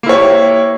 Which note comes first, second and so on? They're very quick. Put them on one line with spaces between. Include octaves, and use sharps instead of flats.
A#3 E4 C#5 G4